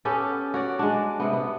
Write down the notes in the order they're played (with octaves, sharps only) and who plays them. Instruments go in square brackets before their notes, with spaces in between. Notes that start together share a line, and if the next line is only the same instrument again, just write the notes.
[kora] B3 C#4 G4 A4
F#4 C#5 D5
G#3 D4
C3 B3
B3